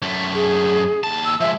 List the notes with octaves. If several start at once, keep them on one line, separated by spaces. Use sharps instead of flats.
F#2 A3
G#4
D#2 A5
E6
F3 G#3 E5